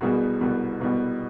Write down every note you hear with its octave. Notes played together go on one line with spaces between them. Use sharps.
C2 B2 G3 B3 F#4 G#4
C2 B2 G3 B3
C2 B2 G3 B3